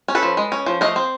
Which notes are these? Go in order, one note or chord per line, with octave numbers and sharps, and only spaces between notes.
C#4
A4 B4
F3
G#3
C#4
F3
A3 D#5 F5
C4